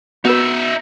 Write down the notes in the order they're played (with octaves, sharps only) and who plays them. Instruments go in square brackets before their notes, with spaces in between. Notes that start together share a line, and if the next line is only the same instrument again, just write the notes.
[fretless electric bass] B3 [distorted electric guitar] D#4 E5 [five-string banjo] F#4 B4